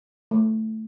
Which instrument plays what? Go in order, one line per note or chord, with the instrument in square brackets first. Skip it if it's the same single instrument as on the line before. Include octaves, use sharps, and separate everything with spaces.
[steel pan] A3